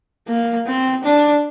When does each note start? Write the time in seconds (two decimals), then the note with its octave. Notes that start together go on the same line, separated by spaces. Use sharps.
0.28 A#3
0.67 C4
1.04 D4